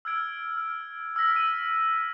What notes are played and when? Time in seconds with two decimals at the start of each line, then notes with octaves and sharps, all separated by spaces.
0.05 E6 F6 G#6 D7
0.57 F6
1.16 E6 F6 A#6 B6
1.35 E6 D#7